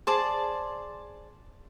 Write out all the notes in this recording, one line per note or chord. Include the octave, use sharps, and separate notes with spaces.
G#4 C5 D5 A5